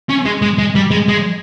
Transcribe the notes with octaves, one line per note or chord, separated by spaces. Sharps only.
C#4
G#3
G#3
G#3
G3
G#3
G#3